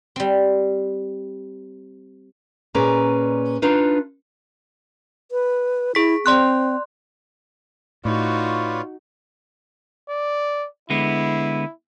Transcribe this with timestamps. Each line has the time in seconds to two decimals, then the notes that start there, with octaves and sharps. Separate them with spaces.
0.16 G3 C4
2.75 A#2 C#4 G#4 B4 D5 A#5
3.62 D4 D#4 F4 B4
5.31 B4
5.95 E4 G#4 B6
6.26 C4 D5 C6 F#6
8.05 A2 D#4 F4 F#4 B4 C#5 D5
10.09 D5
10.90 D3 G#3 B3 E4